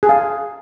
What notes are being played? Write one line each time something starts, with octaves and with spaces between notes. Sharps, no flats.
G#4 F5 A5